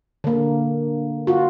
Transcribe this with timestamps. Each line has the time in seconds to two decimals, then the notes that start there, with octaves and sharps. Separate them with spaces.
0.24 D3 A#3
1.27 F4 F#4